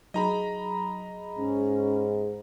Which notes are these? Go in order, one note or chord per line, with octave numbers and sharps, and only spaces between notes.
F#3 D#4 G#4 D#5 A#5 B5
G#2 C#4